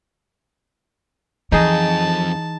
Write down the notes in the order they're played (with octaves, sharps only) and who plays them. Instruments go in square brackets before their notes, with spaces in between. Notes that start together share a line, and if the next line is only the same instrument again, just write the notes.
[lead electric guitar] F2 [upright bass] E3 [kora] D#4 G#4 [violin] A5